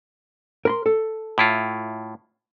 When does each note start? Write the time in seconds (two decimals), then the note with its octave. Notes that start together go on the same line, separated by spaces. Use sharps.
0.65 A#4 B5 C6
0.86 A4
1.38 A2 E4 F4